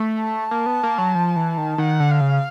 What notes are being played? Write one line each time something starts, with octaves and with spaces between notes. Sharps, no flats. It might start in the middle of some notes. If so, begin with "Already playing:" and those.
Already playing: A3
A5
A#3
B3
A#3
F#3
F3
E3
D#3
D#3 F#5
D3
F5
C#3